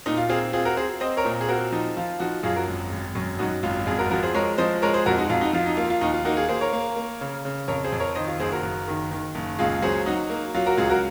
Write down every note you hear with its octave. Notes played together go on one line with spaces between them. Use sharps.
A#2 D#4
F4
C4 F4 G#4
C4 F4 G#4
F#4 A#4
C4 G#4 C5
C4 C5 D#5
A#4 C#5
A#2
G#4
C4 F#4 A#4
F3 D#4
F3 F4
F3 D#4 F#4
F#2 F4 G#4
F#4 A#4
G#1
G#1
F#2
F#2 D#4 F#4
G#1 F4
F2 F4 G#4
F#4 A#4
F3 F#4 A#4
G#4 C5
G#3 A#4 C#5
F3 C5 D#5
G#3 A#4 C#5
G#4 C5
F2 F#4 A#4
D#4 F#4
F2 F4
D#4 F#4
F3 F4
D#4
A#3 F4
F4
D#2 D#4
F4
A#3 D#4 F#4
F4 G#4
A#3 G#4 C5
A#4 C#5
A#3
A#3
C#3
C#3
F2 A#4 C#5
G#4 C5
F2
A#4 C#5
D#3 C5 D#5
F4
F#1 G#4 C5
F#4 A#4
F#1
D#3
D#3
F#1
C#2 F4 G#4
F#3 G#4 C5
F#3 D#4 F#4
A#3
F#3 F4
F#4 A#4
C#2 F4 G#4
F#4 A#4